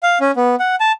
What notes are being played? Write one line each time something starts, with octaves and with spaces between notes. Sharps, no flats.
F5
C#4
B3
F#5
A5